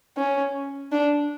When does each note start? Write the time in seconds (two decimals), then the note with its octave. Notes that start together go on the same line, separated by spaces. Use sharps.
0.17 C#4
0.92 D4